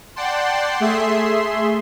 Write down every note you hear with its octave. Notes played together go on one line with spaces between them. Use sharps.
D5 F#5 G5 A5 C6
A3 G#4 E5 C6